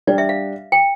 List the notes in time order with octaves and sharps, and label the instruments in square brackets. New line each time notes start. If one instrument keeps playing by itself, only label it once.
[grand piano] G3 D4 G4 [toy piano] D5
[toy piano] E5
F5
G5